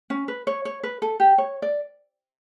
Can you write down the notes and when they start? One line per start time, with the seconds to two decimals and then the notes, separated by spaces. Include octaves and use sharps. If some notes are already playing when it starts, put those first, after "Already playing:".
0.10 C#4
0.28 B4
0.47 C#5
0.65 C#5
0.83 B4
1.02 A4
1.20 G4
1.38 C#5
1.62 D5